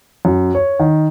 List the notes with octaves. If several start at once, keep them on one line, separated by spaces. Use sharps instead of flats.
F#2
C#5
D#3